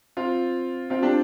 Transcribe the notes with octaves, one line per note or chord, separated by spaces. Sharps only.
C4 F4
C4 F4
D4 G4